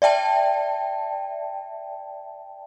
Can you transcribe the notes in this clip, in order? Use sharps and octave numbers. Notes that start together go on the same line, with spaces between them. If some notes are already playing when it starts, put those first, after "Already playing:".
D5 E5 G5 A5